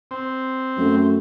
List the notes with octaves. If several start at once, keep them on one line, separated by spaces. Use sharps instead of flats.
C4
F#2 A3